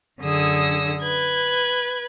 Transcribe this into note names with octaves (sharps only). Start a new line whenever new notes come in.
F#2 D3 G#4 D#6 E6
B4 G#6